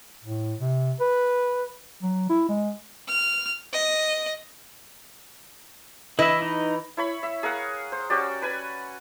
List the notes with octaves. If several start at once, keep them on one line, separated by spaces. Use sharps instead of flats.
A2
C3
B4
F#3
E4
G#3
F6
D#5
E3 E4 B4 D#5 E5
D#4
E4 C#5 B5
E5
G#4 A#4 F5 F#5
C5
C#4 F#4 G4 D5
B4 G#5 B5